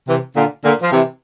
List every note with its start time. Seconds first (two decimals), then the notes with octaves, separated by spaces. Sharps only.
0.07 C3 E3
0.36 A#2 D3
0.64 A#2 D3
0.82 F3
0.92 C3 E3